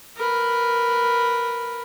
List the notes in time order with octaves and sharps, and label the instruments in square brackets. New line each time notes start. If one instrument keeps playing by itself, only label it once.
[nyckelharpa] A#4 B4